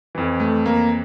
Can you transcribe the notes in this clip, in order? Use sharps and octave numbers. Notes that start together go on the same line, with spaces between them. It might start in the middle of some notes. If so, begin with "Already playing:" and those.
F2 E3
A3
A#3